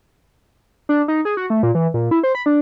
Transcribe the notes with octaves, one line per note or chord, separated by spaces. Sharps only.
D4
D#4
G#4
F#4
A3
A#2
E3
A#2
E4
C5
B5
D4